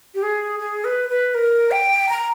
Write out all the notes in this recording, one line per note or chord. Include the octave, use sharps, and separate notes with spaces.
G4
G#4
G#4
B4
B4
A#4
G5
A#5